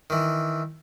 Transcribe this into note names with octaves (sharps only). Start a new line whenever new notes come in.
D#3 E3